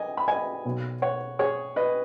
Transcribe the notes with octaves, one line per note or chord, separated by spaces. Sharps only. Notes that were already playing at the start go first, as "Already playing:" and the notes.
Already playing: D#5 G#5
B5
D#5 G#5
B1 B2
C#5 F#5
G#4 C#5
B4 D#5